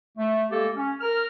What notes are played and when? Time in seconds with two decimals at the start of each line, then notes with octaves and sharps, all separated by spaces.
0.18 A3
0.51 G#3 A#3 G4 A4
0.76 C#4
1.01 A#4 F6